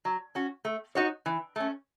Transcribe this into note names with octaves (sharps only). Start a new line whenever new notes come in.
F#3
C#4 F#4
A3
D#4 F#4 C#5
E3
A3 C#4